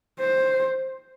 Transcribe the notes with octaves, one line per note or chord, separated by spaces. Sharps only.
C5